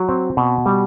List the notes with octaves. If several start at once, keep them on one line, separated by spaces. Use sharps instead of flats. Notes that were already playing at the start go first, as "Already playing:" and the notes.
Already playing: F#3
C4
B2
G3